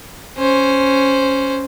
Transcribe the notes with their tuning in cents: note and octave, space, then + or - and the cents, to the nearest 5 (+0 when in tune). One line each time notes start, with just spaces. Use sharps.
C#4 +0 C5 +0